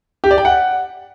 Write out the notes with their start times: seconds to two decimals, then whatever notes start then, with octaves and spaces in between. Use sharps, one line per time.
0.24 G4
0.31 D5
0.38 G5
0.45 F#5